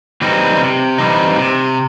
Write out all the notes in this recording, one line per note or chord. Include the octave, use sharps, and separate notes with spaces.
E3 G3 C4 D#4
C3
E3 G3 C4 D#4
C3